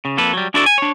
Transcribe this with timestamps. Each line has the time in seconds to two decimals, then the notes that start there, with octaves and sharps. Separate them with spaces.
0.05 C#3
0.17 F2 A#3 A4 B4
0.33 F#3 G3
0.54 D4 E4 F#4 A4 D5
0.66 G#5
0.78 D4 C#5